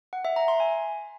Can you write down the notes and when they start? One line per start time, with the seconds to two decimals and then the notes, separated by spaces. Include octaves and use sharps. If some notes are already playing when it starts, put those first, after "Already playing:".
0.13 F#5
0.25 E5
0.36 A#5
0.48 C6
0.60 G#5